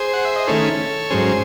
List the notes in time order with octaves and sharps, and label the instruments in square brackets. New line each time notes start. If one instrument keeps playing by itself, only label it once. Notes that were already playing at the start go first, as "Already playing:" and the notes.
Already playing: [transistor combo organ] G#4 C5
F#5
E5
D#5
D#3 A3 C#4 E4 A4 C#5
G#2 F#3 C#4 G#4 C5